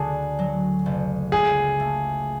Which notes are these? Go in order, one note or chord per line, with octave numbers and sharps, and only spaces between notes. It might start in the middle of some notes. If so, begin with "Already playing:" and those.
Already playing: D2 D3 G#4
F#3
F#1
C#2 G#4
A3